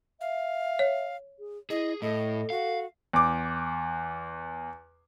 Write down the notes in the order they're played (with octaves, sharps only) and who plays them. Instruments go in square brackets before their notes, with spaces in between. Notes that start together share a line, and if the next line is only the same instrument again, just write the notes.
[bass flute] E5 [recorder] F5
[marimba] C#5
[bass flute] G#4
[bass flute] E4 [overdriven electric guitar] G#4 [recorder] D#5
[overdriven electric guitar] A2 [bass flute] A4 [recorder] D#5
[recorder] F#4 [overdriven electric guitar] F5
[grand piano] E2 D6